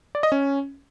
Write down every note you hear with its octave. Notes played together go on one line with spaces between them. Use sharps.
D5
D#5
C#4